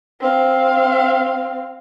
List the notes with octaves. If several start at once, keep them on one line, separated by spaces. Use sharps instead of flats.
C4 F5